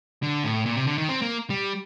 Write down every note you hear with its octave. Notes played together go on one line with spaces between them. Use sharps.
D3
A2
A#2
C3
D3
D#3
C4
A#3
G3